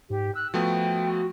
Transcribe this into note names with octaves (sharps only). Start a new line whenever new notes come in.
G#2 G4
E6 F#6
F3 A3 B3 F#4 G5